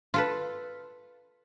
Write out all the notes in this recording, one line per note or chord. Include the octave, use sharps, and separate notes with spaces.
F4 A4 B4